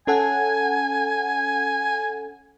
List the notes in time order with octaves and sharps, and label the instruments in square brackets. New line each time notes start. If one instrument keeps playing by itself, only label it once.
[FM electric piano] C#4 A4 F#5 [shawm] G#5